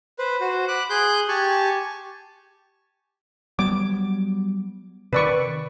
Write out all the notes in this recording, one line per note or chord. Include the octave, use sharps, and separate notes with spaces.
B4 C5
F#4 C5
B5 D6 F#6
G#4 C6 F#6 G6
G4 G#5 A5 C#6
F#3 G3 B3 D6
C3 D#3 B4 D5 C#6